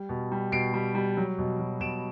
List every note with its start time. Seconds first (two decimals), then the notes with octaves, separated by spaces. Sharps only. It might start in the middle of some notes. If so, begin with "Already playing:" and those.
Already playing: G3
0.09 B2
0.32 G3
0.52 B2 C7 D7
0.74 G3
0.95 G3
1.17 F#3
1.38 B2
1.59 F#3
1.80 B2 D7 E7